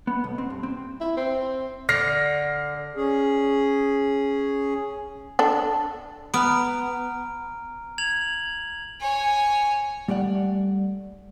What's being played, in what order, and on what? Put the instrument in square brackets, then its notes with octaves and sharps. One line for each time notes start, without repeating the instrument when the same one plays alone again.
[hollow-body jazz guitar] B3
B1
C4
G2
C4
[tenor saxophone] E4
C4
[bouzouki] D3 [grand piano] F6 A#6 C7
[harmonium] C#4 G#4
[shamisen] D4 A4
[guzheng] B3 [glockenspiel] A#5 F6 D7
[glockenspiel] G#6 F7 F#7
[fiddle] C#5 G#5
[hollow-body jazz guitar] G3 A3 D5 F#5